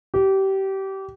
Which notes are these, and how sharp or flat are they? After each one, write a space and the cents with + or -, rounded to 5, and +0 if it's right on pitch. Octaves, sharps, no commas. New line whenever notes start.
G4 -25